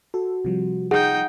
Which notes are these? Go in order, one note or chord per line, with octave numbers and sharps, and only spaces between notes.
F#4 A4
C3 F3 G3
D#4 G#4 F#5 G5